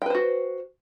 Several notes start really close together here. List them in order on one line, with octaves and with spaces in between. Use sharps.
G5 B4 C5 F#4